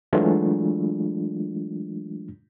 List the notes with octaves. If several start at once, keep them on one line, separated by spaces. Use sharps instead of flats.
E3 F#3 G#3 A3 D4 F4